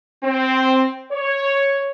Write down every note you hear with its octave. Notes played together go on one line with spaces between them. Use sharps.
C4
C#5